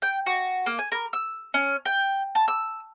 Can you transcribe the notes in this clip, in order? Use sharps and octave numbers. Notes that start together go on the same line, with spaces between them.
G5
F#4
A#3
G#5
A#4
E6
C#4
G5
A5
E6